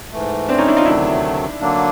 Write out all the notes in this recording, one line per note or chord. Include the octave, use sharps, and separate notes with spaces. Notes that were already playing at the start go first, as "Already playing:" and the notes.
G#2 E3 A3
C4 D4
C#4 D#4
D4 E4
D#4 F4
D2 C3 D#3 F#3 A3 D4 E4
D3 F#3 A#3 D4